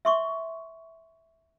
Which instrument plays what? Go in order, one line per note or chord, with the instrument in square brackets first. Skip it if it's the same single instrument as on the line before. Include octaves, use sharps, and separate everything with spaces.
[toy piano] E5 C6 C#6